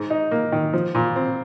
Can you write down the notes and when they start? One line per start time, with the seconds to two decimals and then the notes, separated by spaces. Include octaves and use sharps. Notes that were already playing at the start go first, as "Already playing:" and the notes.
Already playing: G#2
0.10 D#4
0.31 A#3
0.52 D#3
0.74 F3
0.95 A#2
1.16 C4